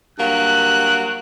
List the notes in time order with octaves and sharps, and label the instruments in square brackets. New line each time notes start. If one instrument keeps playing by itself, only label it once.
[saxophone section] G2 F#3 A#3 [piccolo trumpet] F#6